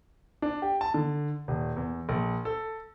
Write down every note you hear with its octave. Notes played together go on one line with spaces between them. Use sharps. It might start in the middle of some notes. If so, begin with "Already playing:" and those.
D4
G4
A5
D3
D#1
E2
A#1
A4